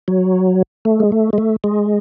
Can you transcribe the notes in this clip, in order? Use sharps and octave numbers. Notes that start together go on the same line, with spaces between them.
F#3
A3
G#3
A3
G#3
A3
G#3